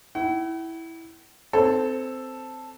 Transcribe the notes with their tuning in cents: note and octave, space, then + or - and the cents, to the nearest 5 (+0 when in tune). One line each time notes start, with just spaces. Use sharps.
E4 -5 F#5 +45
C4 -10 A4 +0 C#5 +0